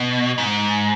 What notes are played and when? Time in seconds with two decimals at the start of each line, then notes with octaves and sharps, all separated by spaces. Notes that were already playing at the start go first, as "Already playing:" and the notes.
Already playing: B2
0.38 G#2